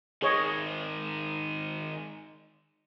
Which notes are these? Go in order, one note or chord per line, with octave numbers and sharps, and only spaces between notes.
D#3 G#3 G#4 C#5 D#5